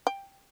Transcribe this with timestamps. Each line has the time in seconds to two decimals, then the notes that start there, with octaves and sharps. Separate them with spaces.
0.07 G5